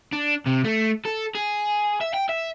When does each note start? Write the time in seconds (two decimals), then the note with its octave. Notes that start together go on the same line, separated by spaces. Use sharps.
0.13 D4
0.46 C3
0.64 A3
1.06 A4
1.35 G#4
2.01 E5
2.14 G5
2.29 E5